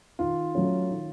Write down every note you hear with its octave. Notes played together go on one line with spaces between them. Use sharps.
D#3 F4
F#3 A3 C#4
D#3